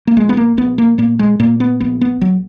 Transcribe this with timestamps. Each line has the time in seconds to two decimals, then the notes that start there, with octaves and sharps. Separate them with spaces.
0.07 A#3
0.17 A#1 G#3
0.29 B3
0.37 A#3
0.57 A#1 B3
0.78 A#3
0.98 A#2 A#3
1.19 G#3
1.40 A#2 A#3
1.60 B3
1.80 A#1 B3
2.01 B3
2.21 A#1 F#3